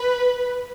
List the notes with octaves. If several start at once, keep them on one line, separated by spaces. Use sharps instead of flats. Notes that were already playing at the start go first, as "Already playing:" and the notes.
Already playing: B4